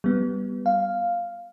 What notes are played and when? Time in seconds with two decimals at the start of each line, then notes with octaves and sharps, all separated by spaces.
0.04 G3 B3
0.66 F5